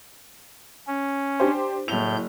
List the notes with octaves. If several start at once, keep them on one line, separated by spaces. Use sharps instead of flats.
C#4
D4 G4 C5
F#1 A2 G6 F7